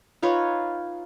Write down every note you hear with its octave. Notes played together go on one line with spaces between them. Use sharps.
D#4 F4 B4 C#5